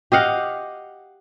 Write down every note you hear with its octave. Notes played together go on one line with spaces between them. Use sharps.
G4 D#5 F5 F#5